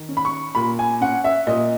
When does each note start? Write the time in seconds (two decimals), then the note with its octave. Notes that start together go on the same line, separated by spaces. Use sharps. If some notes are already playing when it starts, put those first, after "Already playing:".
Already playing: D#3
0.09 C#4
0.17 B5
0.25 C#6
0.55 A#2 B5
0.79 G#5
1.01 C#4 F#5
1.24 E5
1.47 A#2 D#5